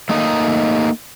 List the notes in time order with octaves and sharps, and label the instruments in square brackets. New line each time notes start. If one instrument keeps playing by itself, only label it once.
[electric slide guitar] A3 A#3 D#4 D#5